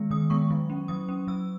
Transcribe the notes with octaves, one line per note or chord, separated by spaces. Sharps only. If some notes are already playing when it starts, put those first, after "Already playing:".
Already playing: D#3 G#3 B3
D#3 D#6
G#3 B3 C#6
F#3
C#4
F#3 D#6
C#4
F#3 E6